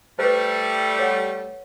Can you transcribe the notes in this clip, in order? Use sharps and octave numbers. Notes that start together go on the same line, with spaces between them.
G3 A3 B4 C5
C#5 F#5